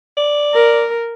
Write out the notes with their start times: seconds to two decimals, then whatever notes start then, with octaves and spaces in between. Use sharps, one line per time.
0.17 D5
0.54 A#4